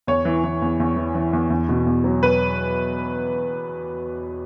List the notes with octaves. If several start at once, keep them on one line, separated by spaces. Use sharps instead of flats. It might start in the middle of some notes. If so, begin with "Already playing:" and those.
E2 C#5
E3
E3
E2
E2
E3
E3
E2
E2
B2
E2
F#3
B4